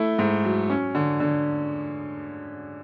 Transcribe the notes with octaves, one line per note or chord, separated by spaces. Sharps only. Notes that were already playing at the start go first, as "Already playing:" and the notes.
Already playing: A3 E4
G#2
F#3
C#4
D3
D3